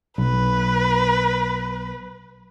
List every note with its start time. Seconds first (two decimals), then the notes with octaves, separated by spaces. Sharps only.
0.18 B1 B4